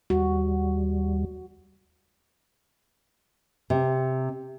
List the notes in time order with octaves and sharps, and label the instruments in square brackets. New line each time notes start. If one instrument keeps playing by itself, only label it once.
[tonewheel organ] D#2 G3 [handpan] F#4
[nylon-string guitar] C3